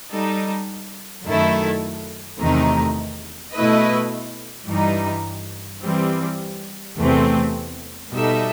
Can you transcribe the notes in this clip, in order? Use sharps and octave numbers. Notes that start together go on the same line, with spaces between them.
G3 D#4 A4
F#2 D#3 A3 E4 A4
E2 C3 D#3 A3 D#4
B2 A3 E4 B4 D#5
G2 E3 G3 D#4
E3 G3 C4
E2 C3 E3 A3 C4
B2 G3 D#4 A4 E5